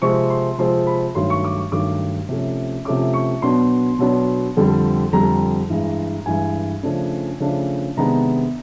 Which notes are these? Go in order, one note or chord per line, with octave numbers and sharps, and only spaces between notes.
C3 F3 G#3 C4 C#6
C6
C3 F3 G#3 C4 C6
B5
G2 D#3 F#3 A3 C6
C#6
D6
C#6
G2 D#3 F#3 A3 D6
C3 F3 A3 C#4
C3 F3 A3 C#4 D6
C#6
B2 F#3 B3 D4 C6
B2 F#3 B3 D4
F2 D3 G3
F2 D3 G3 A#5
G2 E3 G#3
G2 E3 G#3 G#5
C#3 F3 A3 D4
C#3 F3 A3 D4
C3 D#3 G#3 B3 D4 A#5